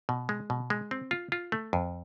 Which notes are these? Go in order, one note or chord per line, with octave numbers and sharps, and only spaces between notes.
B2
G#3
B2
G#3
C4
F4
F4
A3
F2